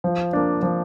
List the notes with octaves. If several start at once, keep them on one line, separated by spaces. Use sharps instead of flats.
F3
A#3 D4
F3